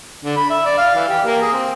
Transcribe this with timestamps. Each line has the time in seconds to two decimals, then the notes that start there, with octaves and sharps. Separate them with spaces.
0.25 D3
0.37 B5
0.50 E5
0.66 D5
0.78 F5
0.95 E3
1.08 G4
1.26 A#3
1.41 G#4
1.53 C4